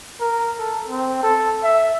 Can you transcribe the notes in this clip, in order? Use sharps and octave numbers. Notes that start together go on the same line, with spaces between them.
A#4
A4
C4
A4
E5